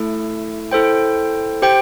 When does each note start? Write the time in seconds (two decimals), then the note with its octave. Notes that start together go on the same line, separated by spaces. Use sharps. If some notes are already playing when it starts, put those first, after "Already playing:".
Already playing: A3 E4 A4
0.71 E4 A4 C5 G5
1.62 G4 C5 G5